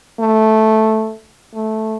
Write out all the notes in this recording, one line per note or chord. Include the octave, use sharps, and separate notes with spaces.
A3
A3